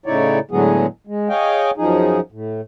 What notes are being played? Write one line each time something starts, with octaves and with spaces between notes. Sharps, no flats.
A2 C#3 D#4 E4 C#5 D5
A2 D3 F#3 G#3 B3 G#4
G#3
G#4 C#5 D#5 F5 G5 G#5
F#2 F3 D#4 G#4
A2